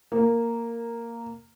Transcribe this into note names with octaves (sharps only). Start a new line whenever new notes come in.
A#3